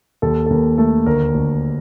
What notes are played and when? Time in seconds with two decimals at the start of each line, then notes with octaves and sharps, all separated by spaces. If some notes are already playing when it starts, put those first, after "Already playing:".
0.22 D#2 A4
0.46 A4
0.50 D#2 A#4
0.78 A3 A4
1.06 D2 A#4
1.34 D2